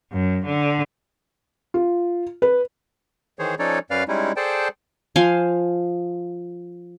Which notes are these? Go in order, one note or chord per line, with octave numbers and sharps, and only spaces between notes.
F#2
D3
F4
B4
D#3 E3 G#4 C5 C#5
F3 C#4 D#4 A4 C#5 D5
F#2 C#4 B4 D5 F5 F6
G3 G#3 C#4 D#4 E4
G#4 A4 C5 D5 G5 A5
F3 C5 F5 G#5